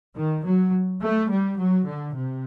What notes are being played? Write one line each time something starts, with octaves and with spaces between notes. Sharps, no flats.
D#3
F#3
A3
G3
F#3
D3
C3